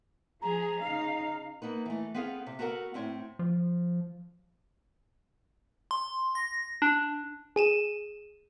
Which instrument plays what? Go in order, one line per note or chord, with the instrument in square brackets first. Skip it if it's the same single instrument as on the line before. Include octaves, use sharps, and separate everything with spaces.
[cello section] F3 G#4 [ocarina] A#5
[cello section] C#3 D#4 F5
[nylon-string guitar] A#3 B3 D#4 B4
E3 A3
B3 C4 G#4 A4 F5
C3
B3 F#4 A4 A#4 F#5
A2 C4 C#5
[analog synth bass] F3
[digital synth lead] C6
A#6
D4
[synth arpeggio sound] G#4 D#7 E7